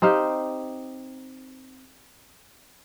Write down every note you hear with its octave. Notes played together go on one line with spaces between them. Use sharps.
C4 D#4 G4 F5